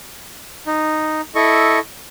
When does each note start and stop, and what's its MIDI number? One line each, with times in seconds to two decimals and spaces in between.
0.67 1.21 63
1.35 1.79 64
1.35 1.79 69
1.35 1.79 75
1.35 1.79 85